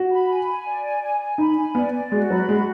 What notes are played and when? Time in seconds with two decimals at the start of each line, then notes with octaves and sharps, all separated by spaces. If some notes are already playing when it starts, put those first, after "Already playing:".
Already playing: F#4
0.11 B5
0.29 G#5
0.47 G#5
0.66 D5
0.84 G#5
1.02 G#5
1.20 G#5
1.38 D#4 B5
1.57 G#5
1.75 B3 D5
1.93 D5
2.12 G#3 F#4
2.30 F#3 B5
2.49 G#3 F#4